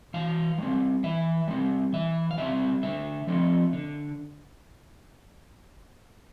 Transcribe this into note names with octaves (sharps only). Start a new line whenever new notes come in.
E3 F5
G3 C4
E3 E5
G3 C4
E3 E5
F5
G3 C4 E5
D3 E5
F3 A3 C4
D3